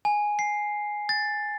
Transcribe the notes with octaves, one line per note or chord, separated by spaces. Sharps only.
G#5
C7
A6